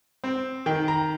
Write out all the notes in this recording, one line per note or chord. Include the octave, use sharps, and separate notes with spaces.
C4
D#3 G5
A#5